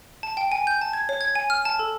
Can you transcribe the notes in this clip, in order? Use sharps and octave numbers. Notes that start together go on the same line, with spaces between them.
A5
G5
G#5
G6
A5
G#6
C#5
G#6
G#5
F6
A5
A4